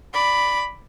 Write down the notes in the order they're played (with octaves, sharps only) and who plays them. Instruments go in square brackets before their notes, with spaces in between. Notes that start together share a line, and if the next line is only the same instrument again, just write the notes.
[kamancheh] D5 B5